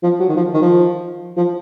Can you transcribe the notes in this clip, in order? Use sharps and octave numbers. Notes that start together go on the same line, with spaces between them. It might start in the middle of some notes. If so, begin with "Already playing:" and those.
F3
F#3
D#3
F3
D#3
F3
F3